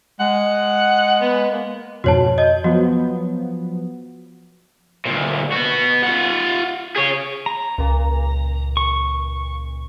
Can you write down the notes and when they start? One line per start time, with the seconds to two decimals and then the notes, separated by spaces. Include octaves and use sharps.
0.20 G#3 F#5
1.21 B3
1.51 A#3
2.04 F2 G#2 B2 F#4 C#5 A5
2.38 D#5 G6
2.64 F3 F#3 B3 F#4
5.05 D2 A#2
5.52 B3 F#4
6.03 F4 F#5
6.96 G#4 C#5
7.46 A#5
7.78 C#2 A#2
8.77 C#6